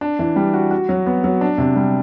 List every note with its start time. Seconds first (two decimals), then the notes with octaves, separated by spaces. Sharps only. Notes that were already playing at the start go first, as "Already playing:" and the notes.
0.01 D4
0.19 E3
0.36 G3
0.54 F#4
0.71 F#4
0.89 F#3
1.06 B3
1.24 F#3
1.41 D4
1.58 C3
1.76 G3